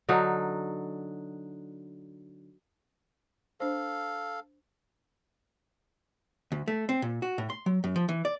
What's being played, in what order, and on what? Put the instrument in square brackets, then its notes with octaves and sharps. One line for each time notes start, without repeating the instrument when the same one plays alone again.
[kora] D3 F#3 D#4
[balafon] D4 C5 [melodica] A4 F5
[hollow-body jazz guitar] D2
A3
C4
A#2
F#4
A2
C6
F#3
F#2
F3
E3
D5